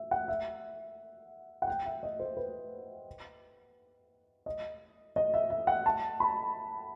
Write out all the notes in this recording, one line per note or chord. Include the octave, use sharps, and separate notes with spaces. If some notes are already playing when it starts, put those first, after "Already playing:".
Already playing: E5
F#5
E5
F#5
G5
E5
D#5
C5
B4
D#5
D#5
E5
E5
F#5
A5
B5